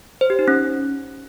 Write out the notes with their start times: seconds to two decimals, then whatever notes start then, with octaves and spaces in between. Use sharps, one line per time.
0.21 C5
0.30 G4
0.39 D#4
0.48 C#4